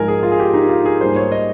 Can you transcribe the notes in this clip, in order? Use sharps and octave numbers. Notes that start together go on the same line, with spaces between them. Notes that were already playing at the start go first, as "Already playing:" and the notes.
Already playing: G#2 F3 G#3 A#4 G#5
G#4
F4
G#4
G4
D#4
F4
G#4
G#2 G3 A#3 C5
C#5
D#5